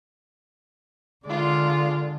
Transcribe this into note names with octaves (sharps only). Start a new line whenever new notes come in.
D3 G#3 F4 D5